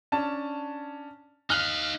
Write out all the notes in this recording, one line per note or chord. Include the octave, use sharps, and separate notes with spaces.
C#4 D4 A5
D#4 F5 F6 F#6 F#7